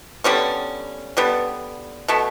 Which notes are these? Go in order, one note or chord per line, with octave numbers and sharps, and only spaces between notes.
D3 G3 B3 C#4
D3 G3 B3
B2 A3 B3